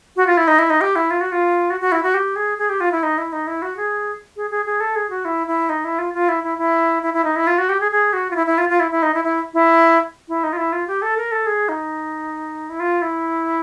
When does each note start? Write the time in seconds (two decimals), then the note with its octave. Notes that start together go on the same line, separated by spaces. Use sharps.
0.16 F#4
0.27 F4
0.37 E4
0.48 D#4
0.59 E4
0.70 D#4
0.81 G4
0.96 E4
1.11 F4
1.21 F#4
1.32 F4
1.70 F#4
1.81 F#4
1.92 E4
2.03 F#4
2.14 G4
2.36 G#4
2.58 G#4
2.70 G4
2.80 F4
2.92 E4
3.03 D#4
3.18 E4
3.32 D#4
3.47 E4
3.62 F#4
3.77 G#4
4.36 G#4
4.51 G#4
4.66 G#4
4.80 A4
4.96 G#4
5.10 F#4
5.25 E4
5.47 E4
5.69 D#4
5.84 E4
5.99 F4
6.14 F4
6.29 E4
6.44 E4
6.58 E4
7.03 E4
7.14 E4
7.24 D#4
7.36 E4
7.47 F4
7.58 F#4
7.69 G4
7.80 G#4
7.92 G#4
8.13 F#4
8.31 F4
8.36 E4
8.47 E4
8.58 F4
8.69 F4
8.80 E4
8.91 E4
9.03 D#4
9.14 E4
9.24 E4
9.54 E4
10.29 E4
10.44 D#4
10.53 F4
10.58 E4
10.72 F4
10.87 G4
11.02 A4
11.17 A#4
11.32 A4
11.46 G#4
11.69 D#4
12.70 E4
12.80 F4
13.02 E4